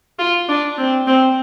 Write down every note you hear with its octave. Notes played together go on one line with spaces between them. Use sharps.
F4
D4
C4
C4